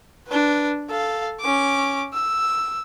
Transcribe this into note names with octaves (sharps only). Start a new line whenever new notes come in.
D4 B4
A4 F5
C#4 D6
E6